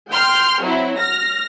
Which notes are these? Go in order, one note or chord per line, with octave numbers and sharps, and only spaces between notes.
G5 C6 F6
F#3 C4 E4
F6 A#6